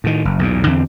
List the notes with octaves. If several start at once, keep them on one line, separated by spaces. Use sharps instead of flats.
A2 D#3
F#1
B1 E2 A#2
E2 D3 C4